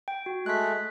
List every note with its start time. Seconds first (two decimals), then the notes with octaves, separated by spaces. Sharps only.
0.08 G5
0.26 F#4
0.46 G#3 A3 F#6 B6